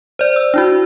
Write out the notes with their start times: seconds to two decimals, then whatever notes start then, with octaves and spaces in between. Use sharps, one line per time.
0.19 C5 D5
0.36 E6
0.54 D4 E4 F#4